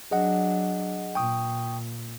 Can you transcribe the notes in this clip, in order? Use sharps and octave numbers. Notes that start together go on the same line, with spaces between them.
F#3 D4 G#4 D#5 F#5
A#2 G5 C#6 D#6